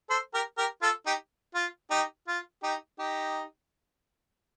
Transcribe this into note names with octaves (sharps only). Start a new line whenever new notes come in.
A4 C5
G4 A#4
G4 A#4
F4 A4
D#4 G4
F4
D#4 G4
F4
D#4 G4
D#4 G4